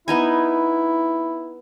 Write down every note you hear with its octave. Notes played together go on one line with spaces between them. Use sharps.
B3 D#4 E4 G#5